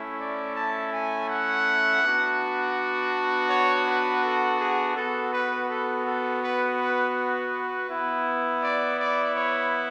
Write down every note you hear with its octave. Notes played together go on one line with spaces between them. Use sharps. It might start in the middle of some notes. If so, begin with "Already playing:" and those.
Already playing: A3 C#4 E4
D5
A5
G#5
F#5
B3 D4 F#4
C#5
B4
A4
G#4
B3 F#4 A4
B4
A4
A4
B4
B4
B4
B3 E4
D5
D5
C#5